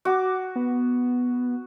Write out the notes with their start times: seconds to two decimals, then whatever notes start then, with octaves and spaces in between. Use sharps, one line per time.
0.05 F#4 D6
0.56 B3